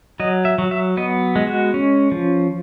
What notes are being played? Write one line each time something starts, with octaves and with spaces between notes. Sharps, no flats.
F#3 D#5
E5
F#3
E5
B3 D#5
G#3
F#4
C#4
F3